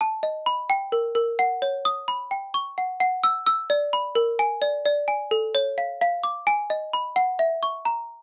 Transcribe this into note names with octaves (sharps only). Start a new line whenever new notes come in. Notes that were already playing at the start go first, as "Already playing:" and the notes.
A5
D#5
B5
G5
A#4
A#4
F#5
C#5
D#6
B5
G5
C#6
F#5
F#5
E6
E6
D5
B5
A#4
G#5
D5
D5
G#5
A4
C#5
F5
F5
D6
G#5
D#5
B5
F#5
E5
C#6
A#5